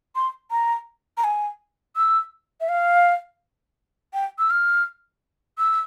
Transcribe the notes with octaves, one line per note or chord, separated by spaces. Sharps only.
C6
A#5
A#5
G#5
E6
E5
F5
G5
E6
F6
E6